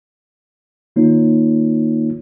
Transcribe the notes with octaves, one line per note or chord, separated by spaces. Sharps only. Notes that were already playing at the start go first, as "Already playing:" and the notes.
D#3 A#3 D#4 F4 C#5